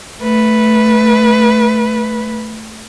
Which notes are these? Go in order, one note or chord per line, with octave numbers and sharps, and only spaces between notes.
A3 B4